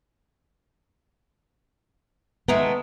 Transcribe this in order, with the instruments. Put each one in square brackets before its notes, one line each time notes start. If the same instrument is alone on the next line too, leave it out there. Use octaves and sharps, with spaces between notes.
[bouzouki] D#3 G#3 A3 [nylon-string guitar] B3